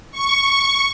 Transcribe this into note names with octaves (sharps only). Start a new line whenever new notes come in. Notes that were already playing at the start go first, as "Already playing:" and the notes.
C#6